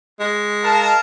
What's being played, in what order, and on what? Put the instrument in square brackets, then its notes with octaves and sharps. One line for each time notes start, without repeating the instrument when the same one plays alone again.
[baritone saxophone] G#3
[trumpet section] A#4 F5 A5